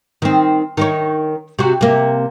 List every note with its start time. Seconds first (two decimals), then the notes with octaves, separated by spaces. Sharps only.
0.22 D#3 C4
0.77 D#3 D#4 C#5
1.59 C3 F#4
1.81 C3 A#3